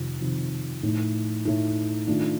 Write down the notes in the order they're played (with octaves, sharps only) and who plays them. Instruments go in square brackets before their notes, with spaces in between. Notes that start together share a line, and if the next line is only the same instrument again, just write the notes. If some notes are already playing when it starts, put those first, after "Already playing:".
Already playing: [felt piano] F2 C3 D#3
F2 C3 D#3
A2 A3 D#4
A2 A3 D#4
D#3 A3 D4 F4